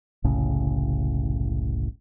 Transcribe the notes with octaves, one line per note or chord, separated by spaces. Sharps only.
F#1 C2 A2 C#3